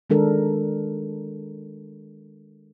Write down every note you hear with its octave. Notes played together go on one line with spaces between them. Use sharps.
D#3 G#3 D4 A4 A#4